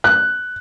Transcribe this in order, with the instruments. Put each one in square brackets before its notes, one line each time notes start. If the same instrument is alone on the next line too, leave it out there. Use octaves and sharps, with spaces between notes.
[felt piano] F#6